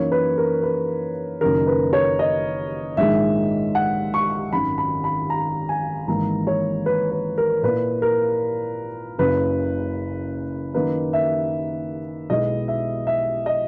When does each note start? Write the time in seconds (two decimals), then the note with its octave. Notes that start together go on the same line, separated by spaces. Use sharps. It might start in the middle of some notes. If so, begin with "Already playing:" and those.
Already playing: F#2 E3 A#3 D#4 C#5
0.12 B4
0.38 A#4
0.63 B4
1.41 F#1 F#2 D#3 A#4
1.67 B4
1.93 C#5
2.19 D#5
2.97 A#1 G#2 D#3 G#3 E5
3.75 F#5
4.14 C#6
4.52 G#1 F#2 D#3 B5
4.78 B5
5.04 B5
5.30 A#5
5.69 G#5
6.07 G#1 G#2 E3 A#3 A#5
6.47 C#5
6.86 B4
7.11 B4
7.38 A#4
7.63 A#2 A#3 E4 B4
8.02 A#4
9.18 F#1 F#2 C#3 B4
10.74 F#2 D#3 A#3 D#4 B4
11.13 E5
12.30 B1 B2 G#3 B3 E4 D#5
12.68 E5
13.07 E5
13.46 D#5